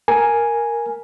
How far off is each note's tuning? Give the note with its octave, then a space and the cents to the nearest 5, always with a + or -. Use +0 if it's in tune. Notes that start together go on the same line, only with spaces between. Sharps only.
A#4 +0 G#5 +0